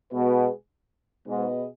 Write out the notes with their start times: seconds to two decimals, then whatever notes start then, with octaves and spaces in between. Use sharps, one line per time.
0.12 B2 G#3 B3 G#4 B4
1.26 G#2 B2 B3 G#4 B4 D#5